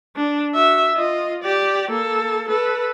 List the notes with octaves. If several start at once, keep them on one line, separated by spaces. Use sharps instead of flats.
D4
F#4 E5
F4 D#5
G4 D5
A#3 A4
A4 B4